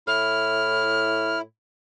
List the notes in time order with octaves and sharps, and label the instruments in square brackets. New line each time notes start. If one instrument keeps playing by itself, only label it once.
[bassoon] A2 [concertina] E4 [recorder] F6